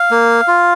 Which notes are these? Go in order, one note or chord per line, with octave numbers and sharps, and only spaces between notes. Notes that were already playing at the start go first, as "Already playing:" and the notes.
Already playing: F5
A#3
F4